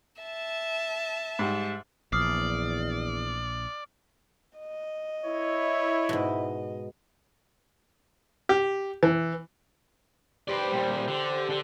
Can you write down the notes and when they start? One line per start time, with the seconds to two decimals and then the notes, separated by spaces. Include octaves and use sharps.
0.22 E5 A5
1.39 G#2 G3
2.13 A#1 E2 D5 D#6 F6 C7
4.58 D#5
5.25 E4 C#5
6.09 G#2 B2
8.49 G4
9.03 E3
10.48 G4 B4 C5 D5
10.72 A#2 G3
11.08 D3
11.50 D3